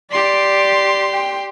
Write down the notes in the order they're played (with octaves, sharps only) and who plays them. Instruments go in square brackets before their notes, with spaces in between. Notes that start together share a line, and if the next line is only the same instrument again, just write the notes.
[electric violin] G4 C6 [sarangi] D5
[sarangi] G5